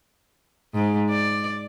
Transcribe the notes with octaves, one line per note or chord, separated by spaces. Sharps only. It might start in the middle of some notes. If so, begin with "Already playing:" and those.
G#2
D5